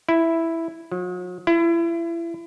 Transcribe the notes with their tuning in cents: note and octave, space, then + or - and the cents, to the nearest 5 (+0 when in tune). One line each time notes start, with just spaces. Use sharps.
E4 +0
F#3 -45
E4 +30